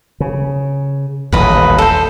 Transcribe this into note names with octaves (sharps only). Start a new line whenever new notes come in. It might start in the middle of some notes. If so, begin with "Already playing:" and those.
C#3
D#1 A1 D#2 B4 D#5
A4 C5